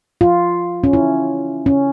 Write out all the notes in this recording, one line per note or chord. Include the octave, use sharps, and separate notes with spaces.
F4
C#4
E4
C#4